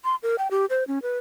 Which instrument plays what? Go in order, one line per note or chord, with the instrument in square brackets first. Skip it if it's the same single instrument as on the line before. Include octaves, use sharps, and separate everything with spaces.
[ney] C6
A#4
G5
G4
C5
C#4
B4